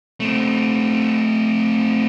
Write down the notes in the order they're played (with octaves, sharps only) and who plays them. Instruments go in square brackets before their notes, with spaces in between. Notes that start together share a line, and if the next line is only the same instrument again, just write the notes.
[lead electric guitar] A3 C4